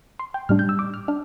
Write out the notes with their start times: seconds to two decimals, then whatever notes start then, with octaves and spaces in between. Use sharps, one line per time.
0.19 C6
0.34 G5
0.49 A2 G3 D4 F6
0.59 G6
0.69 E6
0.79 D6
0.94 F6
1.08 D4 F6